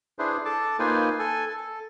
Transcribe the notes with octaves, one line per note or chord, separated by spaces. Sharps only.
D4 E4 G#4 B4 C5
A4 A5 D6
A#3 D#4 F4 B4 C5 G#5
A4 G#5
A4